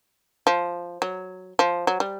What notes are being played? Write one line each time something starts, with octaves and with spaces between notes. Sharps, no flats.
F3
F#3
F3
F#3
G3